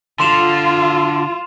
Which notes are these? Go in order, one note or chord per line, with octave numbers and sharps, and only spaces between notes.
D3 F4 C6 E7 F7